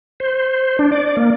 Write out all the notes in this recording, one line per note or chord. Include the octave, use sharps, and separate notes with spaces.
C5
D4
D5
A#3